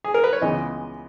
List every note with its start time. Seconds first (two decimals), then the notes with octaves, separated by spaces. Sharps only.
0.04 G#4
0.14 A#4
0.24 B4
0.33 C#5
0.42 C#2 C#3 E3 G#3 B3 D#5